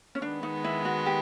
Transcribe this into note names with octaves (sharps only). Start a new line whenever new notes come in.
C#4
D#3 G#3 B3 D4
D#4
E4
F#4
G4